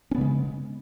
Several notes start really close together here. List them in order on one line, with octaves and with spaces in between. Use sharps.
C#4 B3 C#3 G#3